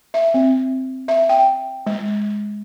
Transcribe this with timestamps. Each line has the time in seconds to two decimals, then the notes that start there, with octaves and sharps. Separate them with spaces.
0.14 E5
0.34 C4
1.08 E5
1.29 G5
1.86 G#3